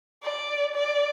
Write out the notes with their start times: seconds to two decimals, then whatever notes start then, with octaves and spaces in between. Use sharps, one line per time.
0.23 D5
0.75 D5